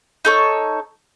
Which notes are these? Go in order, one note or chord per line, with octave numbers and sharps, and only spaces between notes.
D#4 A4 C#5